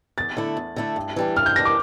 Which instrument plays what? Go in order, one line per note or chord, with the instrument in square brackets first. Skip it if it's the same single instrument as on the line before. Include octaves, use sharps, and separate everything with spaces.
[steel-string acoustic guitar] E2 [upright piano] A6
[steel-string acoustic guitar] D3 A3 E4
E2
D3 A3 E4
G2
E3 G3 D4
[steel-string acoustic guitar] G2 [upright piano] F6
[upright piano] G6
[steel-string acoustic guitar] E3 G3 D4 [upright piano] A#6
[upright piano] D6